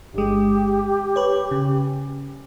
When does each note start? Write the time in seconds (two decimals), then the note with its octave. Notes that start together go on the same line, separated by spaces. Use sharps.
0.14 G1 G#3 G4
1.16 B4 C#5
1.51 C#3